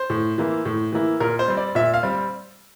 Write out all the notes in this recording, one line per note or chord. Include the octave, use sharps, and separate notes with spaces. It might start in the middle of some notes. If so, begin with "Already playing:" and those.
Already playing: C5
A2
E3 A#3 E4
A2
E3 A#3 E4
A#2 A#4
C5
G3 C4
D5
A#2 E5
F5
G3 C4